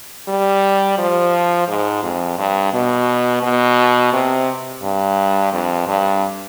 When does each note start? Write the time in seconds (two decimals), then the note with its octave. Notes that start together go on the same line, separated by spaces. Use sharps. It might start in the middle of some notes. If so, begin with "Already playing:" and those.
0.29 G3
0.98 F3
1.69 G#2
2.03 F2
2.39 G2
2.73 B2
3.43 B2
4.13 C3
4.83 G2
5.53 F2
5.88 G2